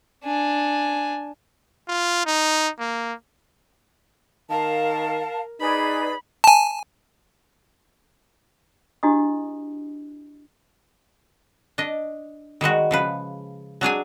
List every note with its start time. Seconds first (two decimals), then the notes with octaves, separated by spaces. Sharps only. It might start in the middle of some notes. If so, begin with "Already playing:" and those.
0.25 D4 G#5
1.88 F4
2.26 D#4
2.79 A#3
4.50 D#3 A#4 F5 A5
5.60 D#4 G#4 B4 D5 B5
6.44 G#5 A5
9.03 D4 E4 F#4 G4 D#5 D#6
11.78 D4 D#5
12.61 D#3 G3 G#3 F#4
12.91 C#3 F3 B4
13.81 F#3 D4 G#4 G#5